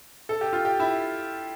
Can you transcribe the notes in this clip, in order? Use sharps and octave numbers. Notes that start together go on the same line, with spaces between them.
A4
G4
F4
G4
E4